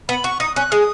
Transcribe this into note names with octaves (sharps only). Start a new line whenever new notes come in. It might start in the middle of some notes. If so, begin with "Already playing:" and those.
B3 B5
F#4 C#6
D#4 D#6
C#4 F#6
G#3 D#6